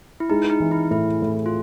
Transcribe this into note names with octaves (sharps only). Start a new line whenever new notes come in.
E4
G#3 D#4
D#4
E3
E4
A2 E4
A2
F4